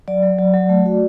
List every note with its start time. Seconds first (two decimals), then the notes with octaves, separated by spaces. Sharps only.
0.08 F#3 D5
0.23 F#3
0.38 F#3
0.53 F#3
0.69 A3
0.86 F#4